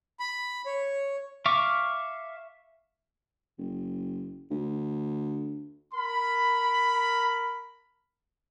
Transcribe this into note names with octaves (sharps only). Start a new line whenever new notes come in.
B5
C#5
E5 F5 C#6 D6
F#1
D2
A#4 B5